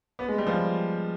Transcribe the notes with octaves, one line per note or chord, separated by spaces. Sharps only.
B3
G#3
G3
F3